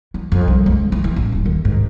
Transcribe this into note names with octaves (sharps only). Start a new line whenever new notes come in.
E3
F2
C2
C#2
E3
E3
A1
D#1
D#2
G#2